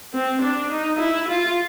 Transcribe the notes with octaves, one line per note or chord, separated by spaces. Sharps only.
C4
D4
D#4
E4
F4